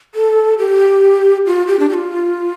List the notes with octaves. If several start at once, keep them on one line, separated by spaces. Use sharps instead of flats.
A4
G4
F4
G4
D4
G4
F4